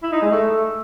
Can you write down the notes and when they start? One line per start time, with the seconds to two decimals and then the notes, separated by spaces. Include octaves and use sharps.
0.03 E4
0.12 D#4
0.22 G#3
0.32 A3